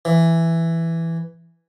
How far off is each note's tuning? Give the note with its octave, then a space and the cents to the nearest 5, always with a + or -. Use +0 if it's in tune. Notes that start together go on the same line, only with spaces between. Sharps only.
E3 +5